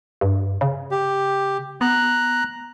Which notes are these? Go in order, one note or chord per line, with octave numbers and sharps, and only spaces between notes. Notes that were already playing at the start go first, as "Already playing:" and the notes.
G2
C#3
G4
B3 A#5 F#6